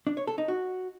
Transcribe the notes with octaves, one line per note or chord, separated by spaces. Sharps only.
D4
C#5
A4
D#4
F#4